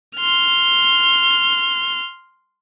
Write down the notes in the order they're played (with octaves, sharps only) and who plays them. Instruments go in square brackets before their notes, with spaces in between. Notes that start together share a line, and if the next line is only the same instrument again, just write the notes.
[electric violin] C6 F6